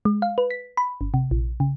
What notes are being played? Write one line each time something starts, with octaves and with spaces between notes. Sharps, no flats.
G#3
F5
B4
B6
B5
G1
C3
A#1
C#3